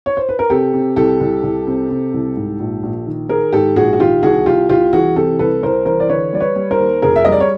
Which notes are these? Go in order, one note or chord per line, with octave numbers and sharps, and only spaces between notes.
C#5
C5
B4
A#4
C3 G4 A4
C3
C2 G4 A4
C2
C2
C3
C3
C2
G#2
A#1
A#1
D#3
D#3 G#4 A#4
G#2 G4 A4
A#1 F#4 G#4
F#4
D#3 F4 G4
C2 F#4 G#4
C2 F4 G4
C2 F4 G4
E3 F#4 G#4
C3 G4 A4
C2 A4 B4
C2 A#4 C5
E3 A#4 C5
D5
D3 B4 C#5
G3 D5
B4 C#5
G3
A#4 C5
D#2
F1 G#4 A#4
E5
G3 D#5
D5
C#5